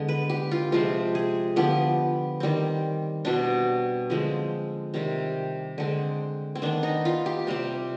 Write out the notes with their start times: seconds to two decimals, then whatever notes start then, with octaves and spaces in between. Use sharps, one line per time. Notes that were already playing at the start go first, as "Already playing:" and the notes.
Already playing: D3 G#3 B3
0.08 B4
0.30 G4
0.51 F4
0.72 C3 F3 G#3 C4 F4
1.15 G#4
1.56 D3 F3 B3 G4
2.40 D#3 G3 C4
3.25 B2 G3 C4 D4
4.10 D3 F3 G#3 C4
4.94 C3 D#3 G3 C4
5.78 D3 G#3 C4
6.55 C4
6.62 D#3 B3 D4
6.83 D#4
7.05 F4
7.26 G4
7.47 C3 G3 C4